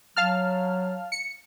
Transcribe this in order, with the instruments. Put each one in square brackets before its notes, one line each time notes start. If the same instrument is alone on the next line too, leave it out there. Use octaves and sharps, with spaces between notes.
[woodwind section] F#3 [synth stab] F5 A5 F6
[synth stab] C#7